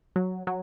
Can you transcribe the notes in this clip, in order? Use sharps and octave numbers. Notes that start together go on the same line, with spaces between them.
F#3
F#3